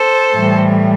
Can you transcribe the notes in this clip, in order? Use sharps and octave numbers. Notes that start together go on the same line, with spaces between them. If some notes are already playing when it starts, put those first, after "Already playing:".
Already playing: A4 C5
A2 E3 G3